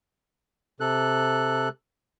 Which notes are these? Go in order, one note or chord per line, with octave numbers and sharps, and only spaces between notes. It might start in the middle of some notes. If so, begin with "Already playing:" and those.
C3 A4 F#6